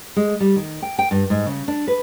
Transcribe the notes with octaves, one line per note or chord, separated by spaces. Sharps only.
G#3
G3
D#3
G5
G5
G2
G#2
C#3
D4
B4